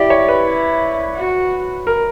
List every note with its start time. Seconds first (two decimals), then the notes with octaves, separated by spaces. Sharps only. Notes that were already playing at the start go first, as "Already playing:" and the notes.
Already playing: E4 G4 D5
0.10 C#5
0.28 B4
0.46 E4
1.16 F#4
1.87 A#4